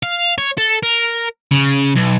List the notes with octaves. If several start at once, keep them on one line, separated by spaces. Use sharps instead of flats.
F5
C#5
A4
A#4
C#3
B1